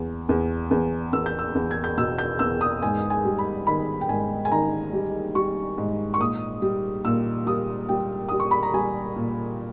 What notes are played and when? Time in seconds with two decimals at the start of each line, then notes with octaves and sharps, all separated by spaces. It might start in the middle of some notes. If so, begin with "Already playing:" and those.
Already playing: E2
0.29 E2
0.71 E2
1.13 E2 E6
1.26 G6
1.39 E6
1.55 E2
1.71 G#6
1.84 G6
1.97 B2 E6
2.18 G6
2.39 E2 E6
2.61 D#6
2.82 G#2 G#5
3.10 G#5
3.25 G3
3.38 B5
3.67 D#3 B5
4.01 G5
4.09 G#2 G#5
4.45 G#5
4.51 D#3 A#5
4.93 G3
5.35 G3 C#6
5.78 G#2
6.14 C#6
6.20 A#2 D#6
6.62 G3
7.05 A#2 E6
7.47 G3 D#6
7.89 G3 G5
8.29 G3 D#6
8.40 C#6
8.51 B5
8.63 A#5
8.74 G3 G#5
9.16 A#2